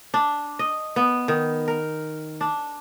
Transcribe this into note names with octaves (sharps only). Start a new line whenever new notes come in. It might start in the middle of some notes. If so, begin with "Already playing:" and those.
D4
D#5
B3
D#3
A#4
D4